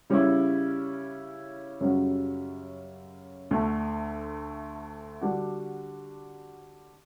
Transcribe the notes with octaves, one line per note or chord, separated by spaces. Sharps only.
C#3 G3 C#4 E4
F#2 C#3 G3 C#4 F#4
D2 D3 A3
D3 G3 D4 F#4